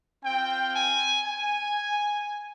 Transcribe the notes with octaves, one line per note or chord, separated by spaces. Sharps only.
C4 F4 G5
G#5
G#5